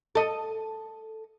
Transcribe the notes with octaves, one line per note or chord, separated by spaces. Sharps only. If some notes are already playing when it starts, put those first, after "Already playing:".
A4 D#5